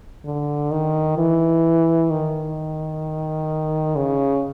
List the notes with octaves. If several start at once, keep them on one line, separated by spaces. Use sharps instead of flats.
D3
D#3
E3
D#3
C#3